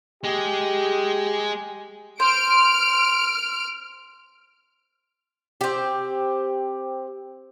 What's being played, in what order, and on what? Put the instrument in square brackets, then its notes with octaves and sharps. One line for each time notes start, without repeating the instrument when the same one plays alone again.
[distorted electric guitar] G#3 G#4 [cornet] G4
[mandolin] C5 [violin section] F6 D7
[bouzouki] C4 G4